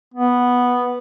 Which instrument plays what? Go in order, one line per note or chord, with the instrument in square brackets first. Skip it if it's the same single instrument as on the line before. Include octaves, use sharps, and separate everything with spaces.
[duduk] B3